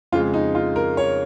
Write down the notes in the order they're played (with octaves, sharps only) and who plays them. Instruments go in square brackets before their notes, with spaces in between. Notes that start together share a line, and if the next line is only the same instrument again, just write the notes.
[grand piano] F2 C#3 G#3 F4
D#4
F4
A#4
C#5